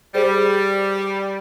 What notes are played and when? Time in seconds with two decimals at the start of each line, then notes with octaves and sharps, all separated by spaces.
0.15 G3 G#4 C5